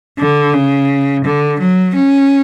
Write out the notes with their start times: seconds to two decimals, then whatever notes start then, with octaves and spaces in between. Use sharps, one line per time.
0.19 D3
0.53 C#3
1.25 D3
1.59 F#3
1.95 C#4